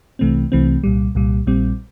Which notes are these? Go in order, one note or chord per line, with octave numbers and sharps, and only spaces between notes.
C2 C3 E3 A3 C4
C2 C3 E3 A3 C4
C2 A#2 G3
C2 A#2 G3
A#1 A#2 G3 C4